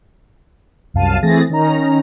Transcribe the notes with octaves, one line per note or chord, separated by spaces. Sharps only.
C2 F#2 F5 A5 D#7
E3 A3 C4 G#4 A6 A#6
D#3 C#4 D#4 A#5